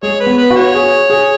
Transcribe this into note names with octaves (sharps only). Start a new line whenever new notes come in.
G#3 G#4 C#5
B4
B3
B4
F#4
C#5
G#4
G#4